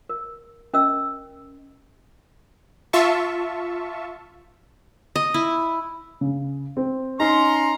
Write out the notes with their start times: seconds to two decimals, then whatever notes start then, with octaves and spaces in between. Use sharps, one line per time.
0.09 A#4
0.74 C#4 A#4 D#5 E6
2.93 F4 E5 A5 C#6
5.16 D#5
5.34 E4
6.21 C#3
6.77 C4
7.20 C#4 D#4 A#5 C6